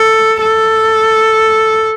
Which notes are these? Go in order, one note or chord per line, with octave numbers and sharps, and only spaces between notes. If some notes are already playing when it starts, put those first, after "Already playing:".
Already playing: A4
A4